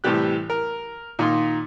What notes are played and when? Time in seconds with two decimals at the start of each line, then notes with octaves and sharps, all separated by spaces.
0.04 A2 C3 E3 G3 G4 F#6
0.50 A#4
1.19 A#2 D#3 D#4 F4 C6